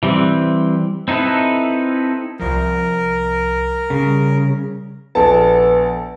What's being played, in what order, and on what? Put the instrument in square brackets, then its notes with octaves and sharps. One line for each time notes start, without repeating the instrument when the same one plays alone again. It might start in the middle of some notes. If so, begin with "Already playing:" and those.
[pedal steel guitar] E3 G3 C4
C4 D#4 E4 A4 B4
[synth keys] C2 F3 [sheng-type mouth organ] A#4
[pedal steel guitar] C#3 [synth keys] G3
[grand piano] A#1 A4 A5 [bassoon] B3